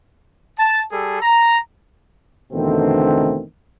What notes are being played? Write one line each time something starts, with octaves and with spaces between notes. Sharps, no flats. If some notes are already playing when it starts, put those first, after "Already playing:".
A5
G3 G#4 A4
A#5
E2 B2 D3 D#3 A3 C4